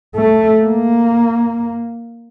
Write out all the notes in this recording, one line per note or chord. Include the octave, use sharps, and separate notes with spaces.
A3
A#3